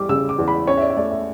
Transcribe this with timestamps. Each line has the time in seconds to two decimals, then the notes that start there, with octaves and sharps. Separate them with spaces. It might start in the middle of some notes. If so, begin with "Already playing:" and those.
Already playing: E2 G3 D6
0.09 C#3 E6
0.29 D6
0.39 E2
0.48 B5
0.67 C#4 C#5
0.77 E5
0.82 D5
0.90 E5
0.97 A3 D5
1.11 E5